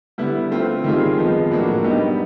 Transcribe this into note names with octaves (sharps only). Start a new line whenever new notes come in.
D3 G3 B3 E4
A3 C4 F4
D#3 G3 C4 F4 G#4
F3 G#3 B3
A2 F#3 A#3 D4 F#4
G3 B3 D#4 G4